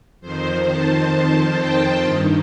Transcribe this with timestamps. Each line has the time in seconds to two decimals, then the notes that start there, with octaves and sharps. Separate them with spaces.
0.21 F2 D#3 C5
0.66 A5
1.11 A5
1.57 G5
2.02 G2 D#3 D#5